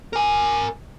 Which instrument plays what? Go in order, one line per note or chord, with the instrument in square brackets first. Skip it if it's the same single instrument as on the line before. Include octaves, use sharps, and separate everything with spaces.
[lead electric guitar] A#4 G#5